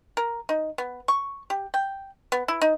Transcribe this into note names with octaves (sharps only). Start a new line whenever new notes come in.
A#4
D#4
B3
C#6
G4
G5
B3
E4
D#4